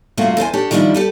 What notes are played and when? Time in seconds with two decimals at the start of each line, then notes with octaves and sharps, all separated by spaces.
0.17 G2 C3 A3 A#3 F4 F#4
0.37 E2 A4 C5 G#5
0.53 D4 G4 A4 C#5
0.71 D#3 F3 G3 C#4 D4 E4
0.94 G4 A4 B4